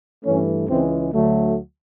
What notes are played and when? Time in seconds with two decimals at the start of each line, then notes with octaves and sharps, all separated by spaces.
0.25 G2 E3 A3 C#4
0.69 C#2 C#3 E3 G#3 C4
1.13 D2 D3 F#3 A3